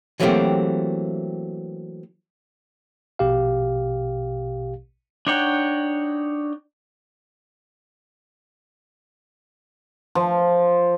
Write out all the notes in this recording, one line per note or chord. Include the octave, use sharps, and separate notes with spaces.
E3 F#3 A3 A#3 C4 G4
A#1 B2 G4 F5
D4 D#4 C#5 F#5 G5
F3